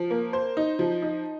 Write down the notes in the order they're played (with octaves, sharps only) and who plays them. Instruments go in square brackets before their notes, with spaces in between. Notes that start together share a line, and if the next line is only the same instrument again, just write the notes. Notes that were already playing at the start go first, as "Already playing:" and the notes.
Already playing: [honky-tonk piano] F3
A#3
C5
D#4
F3
D#4